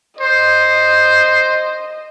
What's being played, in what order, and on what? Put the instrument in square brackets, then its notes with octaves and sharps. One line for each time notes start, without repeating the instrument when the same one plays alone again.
[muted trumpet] C5 [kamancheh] D#5